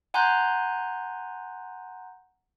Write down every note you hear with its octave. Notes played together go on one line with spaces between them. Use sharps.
F#5 G#5 A#5 C6 F#6 G6